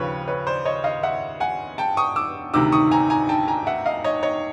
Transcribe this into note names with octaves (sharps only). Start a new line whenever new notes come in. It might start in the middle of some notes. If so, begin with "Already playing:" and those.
Already playing: D#2 C#3 F3 B4 C#5
B4 C#5
C5 D5
C#5 D#5
D#5 F5
E5 F#5
F#5 G#5
G5 A5
C#6 D#6
D6 E6
D2 C3 D#3 D6 E6
C#6 D#6
G#5 A#5
G#5 A#5
G5 A5
G#5 A#5
E5 F#5
D#5 F5
C#5 D#5
C#5 D#5